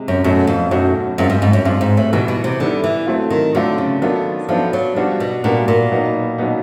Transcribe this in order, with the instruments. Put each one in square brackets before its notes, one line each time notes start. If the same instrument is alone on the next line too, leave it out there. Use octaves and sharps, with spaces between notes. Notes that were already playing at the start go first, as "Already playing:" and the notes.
Already playing: [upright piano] C3 G#3
[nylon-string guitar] F#2
[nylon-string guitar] F#2 [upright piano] B2 F#3 A3 C#4 F#4
[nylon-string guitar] F2
[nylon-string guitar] F#2 [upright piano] B2 F#3 A3 C#4 F#4
[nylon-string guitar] F#2 [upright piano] G#3 C4 F4 G#4
[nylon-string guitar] G2
G#2
F#2
[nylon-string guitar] G2 [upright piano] G#3 C4 F4 G#4
[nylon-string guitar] G#2
A2
[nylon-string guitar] B2 [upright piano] E3 G3 B3 E4
[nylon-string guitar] B2
C3
[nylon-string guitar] D3 [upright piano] E3 G3 B3 E4
[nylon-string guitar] E3
[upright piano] F#3 A3 C4 F4
[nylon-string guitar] D#3
[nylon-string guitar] D3 [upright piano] F#3 A3 C4 F4
[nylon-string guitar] C#3
[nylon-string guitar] D#3 [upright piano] F#3 B3 D4 F4 A4
[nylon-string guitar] F3 [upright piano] F#3 B3 D4 F4 A4
[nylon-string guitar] F#3
[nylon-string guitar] F3 [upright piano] G3 B3 D4 F#4
[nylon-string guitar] B2
[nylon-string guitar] A#2 [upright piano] G3 B3 D4 F#4
[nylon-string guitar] A#2
[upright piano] B2 F#3 B3 D#4
B2 F#3 B3 D#4